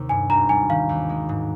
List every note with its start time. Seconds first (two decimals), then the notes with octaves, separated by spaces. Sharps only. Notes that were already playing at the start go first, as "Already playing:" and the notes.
Already playing: D#2 C3 C4
0.09 G2 G#5
0.30 G#1 A#5
0.49 G3 G#5
0.70 D#3 F5
0.89 D#2
1.09 G#3
1.29 G#2